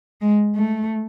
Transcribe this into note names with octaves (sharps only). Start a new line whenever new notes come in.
G#3
A3